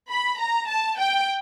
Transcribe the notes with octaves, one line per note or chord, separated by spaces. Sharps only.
B5
A#5
A5
G5